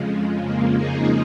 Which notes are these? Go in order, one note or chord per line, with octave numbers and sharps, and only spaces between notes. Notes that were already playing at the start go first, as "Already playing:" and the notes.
Already playing: F2 C#3 F3 G#3
A#3
D#4 G#4